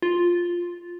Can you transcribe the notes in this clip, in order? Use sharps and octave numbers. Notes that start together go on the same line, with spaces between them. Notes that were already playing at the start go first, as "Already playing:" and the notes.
F4